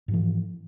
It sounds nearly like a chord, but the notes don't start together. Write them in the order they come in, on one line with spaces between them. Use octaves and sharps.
G#2 F3 E3